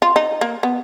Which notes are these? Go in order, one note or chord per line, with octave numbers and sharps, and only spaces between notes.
F4
D#4
A#3
B3